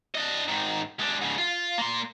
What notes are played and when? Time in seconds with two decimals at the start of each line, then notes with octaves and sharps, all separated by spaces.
0.15 D4 D#5
0.48 G#2 D#3
0.99 G#3 D4
1.21 G#2 C#3
1.38 F4
1.78 A#3 C6